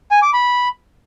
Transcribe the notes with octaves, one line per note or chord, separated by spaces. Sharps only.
G#5
D6
B5